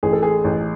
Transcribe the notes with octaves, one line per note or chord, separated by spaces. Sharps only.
A1 G#4
A4
G#4
A1